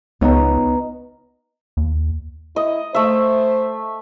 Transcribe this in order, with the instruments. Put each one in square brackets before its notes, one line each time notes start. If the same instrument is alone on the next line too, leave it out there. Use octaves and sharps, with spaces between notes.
[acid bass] C#2 [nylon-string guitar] B3 D#4 C#5 [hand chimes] B4 D#5 A#5
[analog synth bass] D#2
[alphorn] E4 [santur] D#5
[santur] A3 E5 [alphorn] C5